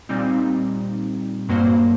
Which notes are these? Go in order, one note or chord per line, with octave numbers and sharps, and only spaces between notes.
A#2 G3 C4 D#4
G2 F#3 A#3 F#4 C5